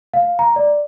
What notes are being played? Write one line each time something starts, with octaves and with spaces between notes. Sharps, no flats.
F5
A#5
D5